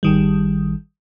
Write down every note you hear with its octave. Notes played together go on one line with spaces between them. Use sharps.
G#1 D#3 G3